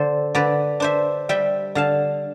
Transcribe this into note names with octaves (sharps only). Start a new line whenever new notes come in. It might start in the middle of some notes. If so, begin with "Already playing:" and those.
Already playing: D3 A4 C5
D3 B4 D5
D4 C5 E5
G3 E5 G5
D3 F5 A5